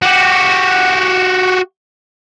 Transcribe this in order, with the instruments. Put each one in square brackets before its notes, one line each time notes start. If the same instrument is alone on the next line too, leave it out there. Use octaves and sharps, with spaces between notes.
[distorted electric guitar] F#4 G4